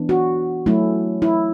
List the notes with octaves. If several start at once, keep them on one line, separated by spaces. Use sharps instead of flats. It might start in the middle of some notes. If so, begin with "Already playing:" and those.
Already playing: E3 B3 D4
F#4
F#3 A3 C#4 E4
E4